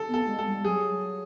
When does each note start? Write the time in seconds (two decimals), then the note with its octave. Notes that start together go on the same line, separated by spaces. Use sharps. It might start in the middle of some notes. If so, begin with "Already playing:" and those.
Already playing: A4
0.08 B3
0.14 A4
0.27 G#3
0.39 A4
0.46 G3
0.64 F#3 G#4